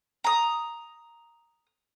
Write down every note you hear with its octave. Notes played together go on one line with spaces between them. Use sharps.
A#5 D#6